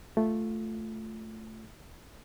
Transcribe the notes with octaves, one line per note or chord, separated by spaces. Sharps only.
A3 F4